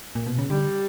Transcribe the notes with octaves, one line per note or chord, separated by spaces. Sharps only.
A#2
B2
C#3
D3 G3